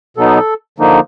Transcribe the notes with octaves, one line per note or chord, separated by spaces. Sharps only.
B2 F#3 B3 D#4 A4
D3 F3 A#3 D#4